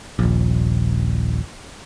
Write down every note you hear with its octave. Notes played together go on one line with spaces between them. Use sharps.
D#1 A#1